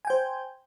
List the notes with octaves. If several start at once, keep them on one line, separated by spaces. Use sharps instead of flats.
C5 G5 G#5